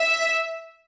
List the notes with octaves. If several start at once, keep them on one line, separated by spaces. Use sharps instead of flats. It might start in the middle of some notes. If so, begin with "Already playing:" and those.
Already playing: E5